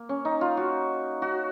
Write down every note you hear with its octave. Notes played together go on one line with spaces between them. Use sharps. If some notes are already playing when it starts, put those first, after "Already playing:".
Already playing: A#3
C#4
D#4
F4
F#4
F#4